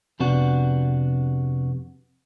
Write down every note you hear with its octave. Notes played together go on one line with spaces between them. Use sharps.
F2 C3 B3 D4 F#4